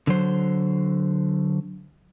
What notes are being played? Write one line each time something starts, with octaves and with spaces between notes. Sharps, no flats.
D3 F#3 C5